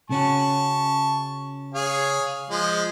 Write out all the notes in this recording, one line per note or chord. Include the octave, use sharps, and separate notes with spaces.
C#3 C#4 F#4 A5 C#6
G#4 C#5 F5
F3 G#3